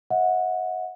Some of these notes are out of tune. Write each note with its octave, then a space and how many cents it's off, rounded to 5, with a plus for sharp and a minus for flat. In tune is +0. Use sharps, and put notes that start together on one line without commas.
D#5 +40 F#5 -20